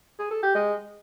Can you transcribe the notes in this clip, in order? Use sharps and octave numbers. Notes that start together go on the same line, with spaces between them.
G#4
A4
G4
G#3